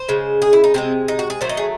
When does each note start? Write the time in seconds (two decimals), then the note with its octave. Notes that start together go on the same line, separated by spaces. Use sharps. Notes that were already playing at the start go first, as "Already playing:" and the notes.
Already playing: C5
0.08 C#3 G#3
0.42 G#4
0.53 E4
0.64 D#4
0.74 C3 E3 G#3 C4
1.08 D#4
1.19 F#4
1.30 G#4
1.41 D#3 F#3 A3 C5
1.49 D#5
1.57 G#4